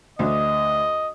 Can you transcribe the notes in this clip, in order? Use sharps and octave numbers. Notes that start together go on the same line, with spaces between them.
D2 D3 D4 D#5